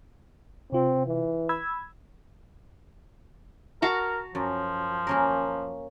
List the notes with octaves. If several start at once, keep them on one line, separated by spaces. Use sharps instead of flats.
C3 C4 F4
E3
B5 E6 G#6
F#4 A#4 A5 A#5
F#2 F3
A#3 C#4 A#4